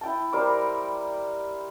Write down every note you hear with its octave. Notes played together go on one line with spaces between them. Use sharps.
E4 G5 A5
G3 A#4 C5 D6